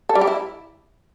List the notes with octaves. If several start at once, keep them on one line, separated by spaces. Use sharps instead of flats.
A4
G3
G4
E4